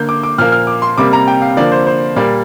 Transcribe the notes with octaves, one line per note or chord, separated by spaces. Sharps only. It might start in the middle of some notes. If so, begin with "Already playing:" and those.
Already playing: D3 A#3 G6
D6
D6
A#2 F3 A#3 F6
F6
D6
C6
C3 G3 A#3 D6
A#5
G5
F5
D3 F3 A#3 D5
C5
C5
A#2 G3 A#3 D5